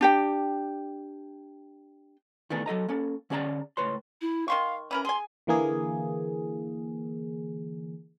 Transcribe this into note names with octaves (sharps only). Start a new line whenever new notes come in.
D4 G4 G5
D#3 E3 A3 B3 D4 G#4
F#3 A4 D#5 A#5
A#3 C#4 A4
D3 C#4 G#4 D5 A5 A#5
C#2 A2 B4 C#5 C6
E4
D#3 F5 C6 C#6
E3 C#4 A#4 B5
G#4 G#5 C6
D3 E3 A#3 G#4